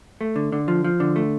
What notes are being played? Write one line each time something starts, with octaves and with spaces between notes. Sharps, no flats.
A3
D3
D3
F3
F3
D3
A3